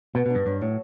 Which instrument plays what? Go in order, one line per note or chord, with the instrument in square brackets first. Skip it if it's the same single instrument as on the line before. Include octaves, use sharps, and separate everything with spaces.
[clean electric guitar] B2 [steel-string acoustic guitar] B3
[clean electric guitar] B2 [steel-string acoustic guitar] D4
[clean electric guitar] G2
[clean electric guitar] G2 [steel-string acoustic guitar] F#3
[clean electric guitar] A2 [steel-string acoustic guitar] F#3